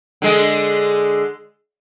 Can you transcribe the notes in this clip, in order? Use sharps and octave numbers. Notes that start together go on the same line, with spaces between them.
D3 G#3